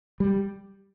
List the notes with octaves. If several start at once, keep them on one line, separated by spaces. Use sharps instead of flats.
G3